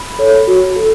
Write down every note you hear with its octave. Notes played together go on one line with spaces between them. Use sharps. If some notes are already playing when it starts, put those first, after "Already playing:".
Already playing: B5
A4 C#5
F#4
A4